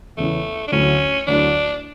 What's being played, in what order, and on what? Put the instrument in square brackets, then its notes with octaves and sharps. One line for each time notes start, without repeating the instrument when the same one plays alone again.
[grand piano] E2 C#3 E3 [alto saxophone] A3
[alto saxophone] D4
[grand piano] D2 D3 F#3 A3 E4 [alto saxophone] C#4
[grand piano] D2 D3 F#3 A3 E4 [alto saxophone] D4